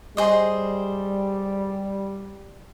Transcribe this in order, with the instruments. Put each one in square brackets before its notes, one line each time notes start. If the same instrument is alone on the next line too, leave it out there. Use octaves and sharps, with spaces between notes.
[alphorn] G3 [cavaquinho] G#4 C5 D#5